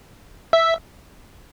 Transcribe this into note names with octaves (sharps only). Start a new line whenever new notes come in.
E5